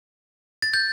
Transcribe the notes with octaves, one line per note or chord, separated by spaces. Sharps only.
A6
G6